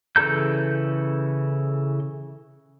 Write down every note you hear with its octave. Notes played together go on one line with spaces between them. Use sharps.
C#3 E3 A4 A#5 G6